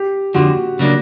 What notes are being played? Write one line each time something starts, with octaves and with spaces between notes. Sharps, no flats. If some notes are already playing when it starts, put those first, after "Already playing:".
Already playing: G4
F2 D3 F3 F#4
C#3 F#3 A#3 D4